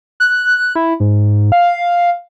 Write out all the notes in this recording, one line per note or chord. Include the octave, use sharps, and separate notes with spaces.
F#6
E4
G#2
F5